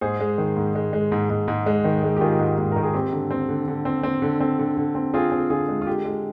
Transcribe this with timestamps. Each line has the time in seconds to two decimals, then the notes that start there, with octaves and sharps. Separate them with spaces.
0.01 G#2 G#4 C5
0.20 G#3
0.38 D#3
0.56 G#2
0.75 G#3
0.93 G#3
1.12 G#2
1.30 G#2
1.48 G#2
1.66 G#3
1.84 D#3
2.03 G#3
2.17 G4
2.21 D#3 F4 G#4
2.39 G#2
2.58 G#2
2.72 D#3 A#4
2.83 G#4
2.94 C4 G4
3.13 D3
3.31 C4
3.49 D3
3.68 D3
3.85 C4
4.03 C4
4.22 D3
4.40 C4
4.59 D3
4.77 D3
4.95 C4
5.14 C4 F4 G#4
5.32 C4
5.50 D3 F4 G#4
5.68 G#3
5.81 F4
5.87 D3 G4
6.05 G#3